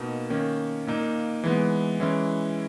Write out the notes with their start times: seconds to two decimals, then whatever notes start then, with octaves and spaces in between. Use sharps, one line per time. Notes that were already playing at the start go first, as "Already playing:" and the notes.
Already playing: B2 A#3 D#4
0.30 D#3 A#3 C#4
0.87 A#2 A#3 D#4
1.44 E3 G#3 B3
2.00 E3 G#3 C#4 E4